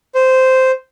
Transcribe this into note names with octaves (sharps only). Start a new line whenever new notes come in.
C5